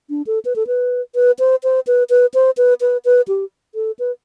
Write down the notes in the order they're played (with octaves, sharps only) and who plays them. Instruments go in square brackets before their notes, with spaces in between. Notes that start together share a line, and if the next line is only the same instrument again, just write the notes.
[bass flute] D4
A4
B4
A4
B4
B4
C5
C5
B4
B4
C5
B4
B4
B4
G4
A4
B4